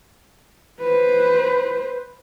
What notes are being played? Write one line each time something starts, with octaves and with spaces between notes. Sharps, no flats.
B4 C5